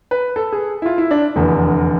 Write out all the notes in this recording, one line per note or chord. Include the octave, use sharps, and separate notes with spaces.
B4
A4
G#4
E4
F4
E4
D4
F1 E2 D3